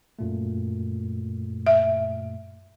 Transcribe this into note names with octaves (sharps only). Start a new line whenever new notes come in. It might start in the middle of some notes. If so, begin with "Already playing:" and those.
F#2 A#2 A3
E5